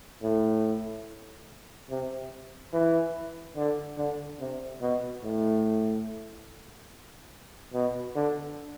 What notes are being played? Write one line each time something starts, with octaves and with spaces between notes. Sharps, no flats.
A2
C3
E3
D3
D3
C3
B2
A2
B2
D3